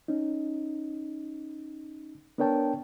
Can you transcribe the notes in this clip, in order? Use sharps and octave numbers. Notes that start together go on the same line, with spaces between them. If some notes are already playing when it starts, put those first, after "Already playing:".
C#4 D#4
B3 D4 A#4 C#5 G5 A5